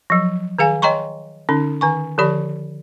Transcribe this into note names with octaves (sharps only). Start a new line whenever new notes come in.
F3 F#3
D#3 G#4 F5 G#5
C#5 D#5 G5 A#5 C6 C#6
D3 C#4 D#4
D#3 G#5 C#6
D3 F3 G4 D5 B5